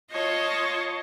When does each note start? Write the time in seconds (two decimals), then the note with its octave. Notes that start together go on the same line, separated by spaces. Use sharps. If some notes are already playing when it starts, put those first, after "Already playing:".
0.12 F4 C#5 D#5 A5